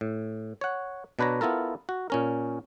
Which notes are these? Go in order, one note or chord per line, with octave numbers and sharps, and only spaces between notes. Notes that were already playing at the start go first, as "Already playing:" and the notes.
A2
C#5 F#5
B2 D4 B4 C#5 A#5
B3 E4 F4 A4 A#4
F#4
A#2 C#4 A#4